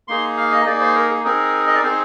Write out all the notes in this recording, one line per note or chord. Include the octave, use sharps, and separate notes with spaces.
A#3 D#4 G#4 C6
F5
D#5
A#3 D#4 G#4 D5
C5
A#4
G#4
C4 D#4 G#4 A#4
D#5
D5
C4 D#4 G#4 C5